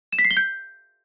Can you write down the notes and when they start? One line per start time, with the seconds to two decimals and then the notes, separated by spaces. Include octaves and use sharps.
0.13 E7
0.19 B6
0.25 C7
0.31 G7
0.37 G6